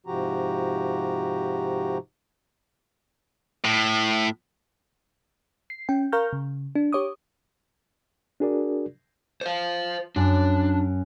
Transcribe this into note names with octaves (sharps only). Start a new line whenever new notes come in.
G#2 C3 F3 F#4 G4 A#5
A2
C7
C#4 G5
A#4 F5 A#5 C#6 F6 G6
C#3
D4
G4 C#5 D6 D#6
D4 F#4 G#4 A#4 D5
C5 F5
F#2 D4